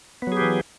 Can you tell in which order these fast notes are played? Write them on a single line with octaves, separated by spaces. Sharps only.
B3 F#3 G#4 G4 E3